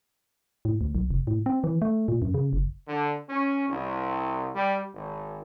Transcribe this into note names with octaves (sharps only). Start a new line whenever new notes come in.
A2
D2
B1
F1
A2
C4
E3
A3
A#2
F#2
C#3
F#1
D3
C#4
C2
G3
G#1